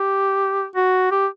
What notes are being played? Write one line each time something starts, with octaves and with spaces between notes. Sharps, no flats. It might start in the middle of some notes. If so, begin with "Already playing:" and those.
Already playing: G4
F#4
G4